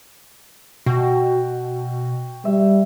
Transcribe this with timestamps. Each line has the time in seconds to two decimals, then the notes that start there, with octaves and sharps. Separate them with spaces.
0.86 B2 F#4 G5
2.45 G3 E5